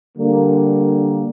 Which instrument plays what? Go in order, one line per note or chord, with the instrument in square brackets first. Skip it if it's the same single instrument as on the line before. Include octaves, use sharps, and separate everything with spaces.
[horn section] D3 G3 A#3